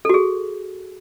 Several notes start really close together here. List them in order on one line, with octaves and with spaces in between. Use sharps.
A4 F#4 G#4